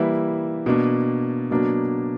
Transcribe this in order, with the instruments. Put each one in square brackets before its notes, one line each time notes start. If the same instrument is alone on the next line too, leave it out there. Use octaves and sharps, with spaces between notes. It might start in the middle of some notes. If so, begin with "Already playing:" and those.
Already playing: [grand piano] E3 G3 A#3 E4 B4
B2 A#3 D4
B2 F#3 A#3 D4